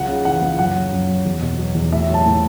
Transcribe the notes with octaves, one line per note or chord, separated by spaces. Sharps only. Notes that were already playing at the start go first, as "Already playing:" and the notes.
Already playing: C#2 F#3 F#5
C#3
E3 F#5
C#2
F#2 F#5
F#3
F#2
F#3
E2
B2
F#3
E2
A2 E5
F#3
A5
A2